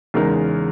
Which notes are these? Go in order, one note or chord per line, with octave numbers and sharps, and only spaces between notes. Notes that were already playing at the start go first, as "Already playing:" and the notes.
E2 C#3 G#3 D#4 A#4